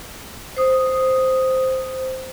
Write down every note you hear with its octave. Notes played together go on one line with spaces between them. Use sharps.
C5 D#6